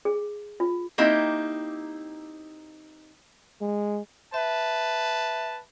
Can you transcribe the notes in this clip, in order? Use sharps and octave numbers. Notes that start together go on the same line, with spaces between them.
G#4
F4
A#3 C4 D#4 E4 G4
G#3
B4 E5 A5